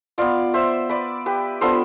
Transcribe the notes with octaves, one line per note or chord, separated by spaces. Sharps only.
B3 F4 D5 F5
C5 E5
B4 D5
G4 B4
B3 D4 F4 A4 C5